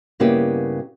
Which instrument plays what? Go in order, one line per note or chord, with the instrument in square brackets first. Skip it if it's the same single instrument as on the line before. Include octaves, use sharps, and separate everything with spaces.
[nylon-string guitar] G2 C#3 A#3 B3 E4 G4